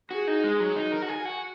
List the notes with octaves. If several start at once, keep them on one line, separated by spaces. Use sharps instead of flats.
F#4 G#4
D#4
G#3
F#3
D#4
A#4
F#4
G#4
F#4